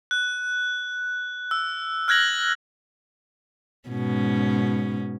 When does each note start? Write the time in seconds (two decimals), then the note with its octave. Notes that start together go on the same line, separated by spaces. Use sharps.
0.11 F#6
1.51 E6
2.08 F6 F#6 G#6 A#6 F#7
3.89 G#2 B2 C#4